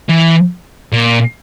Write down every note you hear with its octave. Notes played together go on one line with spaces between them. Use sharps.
E3
A#2